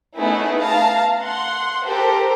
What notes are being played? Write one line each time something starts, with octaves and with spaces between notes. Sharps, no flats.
A3 B3 C#4 D#4 E4 G#4
F5 A5 A#5
F#5 C6
G4 A4 A#4 C5